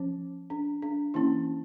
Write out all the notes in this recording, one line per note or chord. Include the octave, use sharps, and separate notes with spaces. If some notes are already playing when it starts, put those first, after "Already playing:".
Already playing: F3 C#4
D4
D4
E3 A#3 C#4 E4